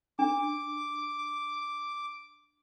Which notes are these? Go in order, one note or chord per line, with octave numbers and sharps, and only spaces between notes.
D4 D6